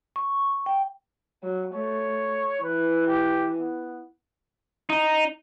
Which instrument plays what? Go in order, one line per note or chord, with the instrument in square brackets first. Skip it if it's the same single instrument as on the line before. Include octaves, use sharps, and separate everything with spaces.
[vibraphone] C#6
G5
[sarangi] F#3
[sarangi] A3 [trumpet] C#5
[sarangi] E3 [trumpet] B4
[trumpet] G4
B3
[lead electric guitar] D#4